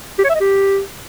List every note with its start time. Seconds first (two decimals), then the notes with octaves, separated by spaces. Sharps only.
0.18 G4
0.24 C#5
0.29 E5
0.35 D#5
0.40 G4